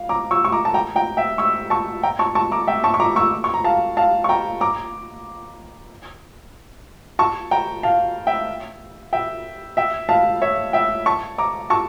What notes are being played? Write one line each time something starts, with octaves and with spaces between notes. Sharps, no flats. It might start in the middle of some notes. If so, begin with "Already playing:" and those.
Already playing: F5
A#5 D6
C#6 E6
C#6
A#5 D6
A5
G5 A#5
G5 A#5
E5 G5
C#6 E6
A5 C#6
G5 A#5
A5 C#6
A5 C#6
A#5 D6
E5 G5
A5 C#6
C#6
A#5 D6
C#6 E6
C#6
A#5
F5 A5
F5 A5
C#6
G5 A#5
A#5 D6
A5 C#6
G5 A#5
F5 A5
E5 G5
E5 G5
E5 G5
F5 A5
C#5 E5
E5 G5
A5 C#6
A#5 D6
A5 C#6